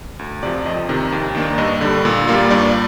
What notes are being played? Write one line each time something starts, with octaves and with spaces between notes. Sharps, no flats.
D2
C3 F3 D5
F2 D#5
C3 D#3
D#2
D#3 A#3 D4
G2 D#5
D3 G3
A#2
G3 A#3 F4
G2 D5